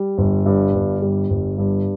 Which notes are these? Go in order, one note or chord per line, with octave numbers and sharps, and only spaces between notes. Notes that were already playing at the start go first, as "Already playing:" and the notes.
Already playing: G3
G1
G2
G1
G3
G1
G2